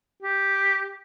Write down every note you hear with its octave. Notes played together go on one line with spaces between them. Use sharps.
G4